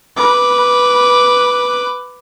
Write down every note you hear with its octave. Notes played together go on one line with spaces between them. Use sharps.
B4 D6